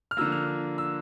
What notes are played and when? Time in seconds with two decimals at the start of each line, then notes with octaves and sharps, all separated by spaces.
0.11 F6
0.17 D3 F3 A#3 E6
0.32 F6
0.78 E6